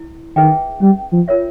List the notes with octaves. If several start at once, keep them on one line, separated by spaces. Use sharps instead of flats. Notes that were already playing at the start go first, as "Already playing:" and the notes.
Already playing: E4
D#3 G#4 B4 E5 G5
G3 C#4
F3
F4 A#4 C#5 E5